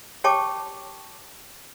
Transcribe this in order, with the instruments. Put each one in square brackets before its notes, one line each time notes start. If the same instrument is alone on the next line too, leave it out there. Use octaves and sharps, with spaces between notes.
[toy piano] G4 C#5 G5 A5 C#6 D6